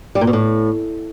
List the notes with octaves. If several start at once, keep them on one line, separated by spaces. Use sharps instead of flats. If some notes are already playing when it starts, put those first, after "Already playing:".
G3
A#2
B2
A2